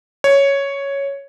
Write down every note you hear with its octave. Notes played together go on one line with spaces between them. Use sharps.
C#5